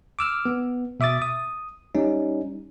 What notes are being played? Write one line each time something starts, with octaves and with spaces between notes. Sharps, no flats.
D6 E6 F6
B3
B2 E5 D6 D#6 A6
D#6
G3 C#4 D#4